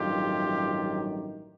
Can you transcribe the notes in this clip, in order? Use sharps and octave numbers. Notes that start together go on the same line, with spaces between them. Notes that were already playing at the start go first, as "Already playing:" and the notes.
Already playing: A1 G2 D#3 F#3 F4 G4